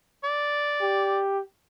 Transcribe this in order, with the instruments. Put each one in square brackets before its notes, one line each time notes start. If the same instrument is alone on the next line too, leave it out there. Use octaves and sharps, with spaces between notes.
[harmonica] D5
[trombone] G4